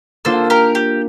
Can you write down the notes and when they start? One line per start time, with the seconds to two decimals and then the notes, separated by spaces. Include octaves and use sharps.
0.25 A#3 D4 F4 A4 C5
0.50 G4 A#4
0.75 G4